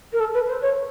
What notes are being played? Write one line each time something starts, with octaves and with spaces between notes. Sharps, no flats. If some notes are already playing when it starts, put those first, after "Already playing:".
A#4
A4
B4
C5
C#5